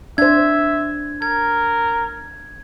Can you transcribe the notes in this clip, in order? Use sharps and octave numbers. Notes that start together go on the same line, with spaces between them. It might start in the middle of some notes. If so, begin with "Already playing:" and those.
D4 C5 E5 G#6
A#4 G#6